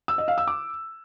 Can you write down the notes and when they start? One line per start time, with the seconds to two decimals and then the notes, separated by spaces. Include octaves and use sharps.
0.08 E6
0.18 D#5
0.28 F5
0.38 E6
0.47 D6